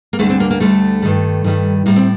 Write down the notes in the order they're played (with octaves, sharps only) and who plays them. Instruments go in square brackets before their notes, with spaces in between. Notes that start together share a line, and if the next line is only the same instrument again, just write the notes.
[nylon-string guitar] A#3
D2 D3 G3 A3
C4
A#3
A#3
D2 D3 G3 A3
G2 D#3 G3
G2 D#3 G3
A2 G3 A#3
C4